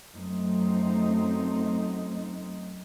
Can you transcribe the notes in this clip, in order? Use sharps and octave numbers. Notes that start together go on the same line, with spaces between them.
F#2 A3 C4 D#4